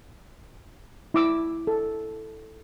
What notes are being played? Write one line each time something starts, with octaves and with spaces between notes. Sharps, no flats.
E4 D6 E6
A4